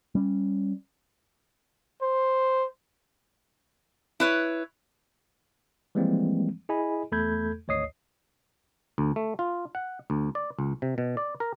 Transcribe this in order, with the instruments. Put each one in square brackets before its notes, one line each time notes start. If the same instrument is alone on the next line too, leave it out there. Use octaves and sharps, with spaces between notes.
[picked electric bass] G3 C#4
[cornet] C5
[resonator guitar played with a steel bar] E4 B4 C#5
[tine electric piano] E3 F3 G3 G#3 A#3 C4
E4 G#4 D#5 G#5 B5
E2 A3 A4 B5 G6 G#6
G#1 D2 C#5 D#5 D#6 C7
[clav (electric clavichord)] D2
A3
F4
F#5
D2
D5
C#2
C3
B2
D5
A#4